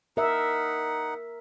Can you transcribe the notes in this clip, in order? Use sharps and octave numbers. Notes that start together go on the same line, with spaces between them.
D#4 A#4 E5 F#5